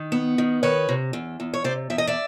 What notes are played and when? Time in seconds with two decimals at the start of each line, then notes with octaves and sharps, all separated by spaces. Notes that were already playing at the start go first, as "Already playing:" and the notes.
Already playing: D#3
0.12 B3
0.38 D#3
0.63 D#3 B4 C#5
0.89 C3
1.13 E2
1.40 E2
1.54 C#5
1.64 C3 C5 D5
1.90 E2 E5
1.98 D#5
2.07 D5 E5